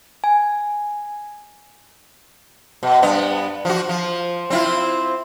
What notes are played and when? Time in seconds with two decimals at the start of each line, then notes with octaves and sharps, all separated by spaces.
0.24 G#5
2.83 B2
3.02 G2 B3
3.65 F3 F#4
3.89 F3
4.50 C4 E4 F4